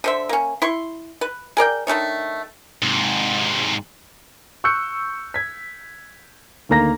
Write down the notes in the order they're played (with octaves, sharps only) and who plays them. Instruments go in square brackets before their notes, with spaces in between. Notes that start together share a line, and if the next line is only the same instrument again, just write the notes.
[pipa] D3 C5 E5
A#3 C#4
E4 C6 C#6
B4
G#4 A#4 D5 G5
D#3 A3 D4 C#5
[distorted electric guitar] G#2 C3
[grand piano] C#6 E6 F#6 G6 C#7
G#6 B6
D2 D#3 A#3 A#5 A#6